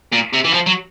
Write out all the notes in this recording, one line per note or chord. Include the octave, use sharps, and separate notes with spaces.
A#2
C3
E3
F3
F#3